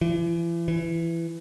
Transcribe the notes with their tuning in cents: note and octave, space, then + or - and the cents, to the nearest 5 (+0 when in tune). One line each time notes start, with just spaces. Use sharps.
E3 +40
E3 +20